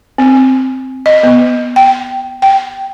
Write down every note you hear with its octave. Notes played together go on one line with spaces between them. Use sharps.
C4
D#5
B3
G5
G5